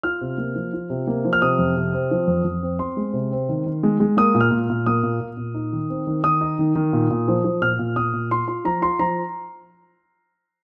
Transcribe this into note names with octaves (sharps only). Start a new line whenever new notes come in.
F4 F6
C3
A#3
F3
F4
C3
A#3
F3
F6
C3 D#6
F2
C3
C4
F3
F2
F2
C4
C4 C6
G#3
C3
C4
D#3
D#3
G#3
G#3
A#3 D#6
A#2
F6
A#2
A#2
A#3 D#6
A#2
A#2
A#2
D#4
D#3
C4
D#3
D#3 D#6
D#4
D#3
D#3
A#2
A#2
F3
F3
A#2 F6
A#2
A#2 D#6
A#2
F4 C6
F4 C6
F3 A#5
F4 C6
F3 A#5